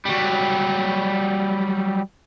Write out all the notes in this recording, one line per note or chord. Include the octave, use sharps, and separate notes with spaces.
F#3 G3